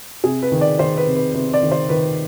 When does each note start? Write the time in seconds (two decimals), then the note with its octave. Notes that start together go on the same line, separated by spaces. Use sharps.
0.24 C3 G#4
0.42 B4
0.52 D#3
0.61 D5
0.79 D#3 C5
0.97 B4
1.06 C3
1.16 B4
1.34 C3 B4
1.53 D5
1.63 D#3
1.71 C5
1.89 D#3 B4